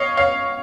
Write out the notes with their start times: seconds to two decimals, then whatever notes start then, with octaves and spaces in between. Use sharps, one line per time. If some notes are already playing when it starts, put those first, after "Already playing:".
Already playing: C#5 D#5 F5
0.17 C#5 F5